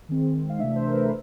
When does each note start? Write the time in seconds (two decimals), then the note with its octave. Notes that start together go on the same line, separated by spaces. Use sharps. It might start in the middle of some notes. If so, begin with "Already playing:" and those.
0.09 D#3 G#3 C4
0.50 F5
0.59 C3 E3 A3 D4 E5
0.75 C5
0.87 A#4
0.93 B4
1.04 A4